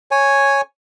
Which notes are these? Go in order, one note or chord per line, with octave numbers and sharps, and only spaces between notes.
C#5 G#5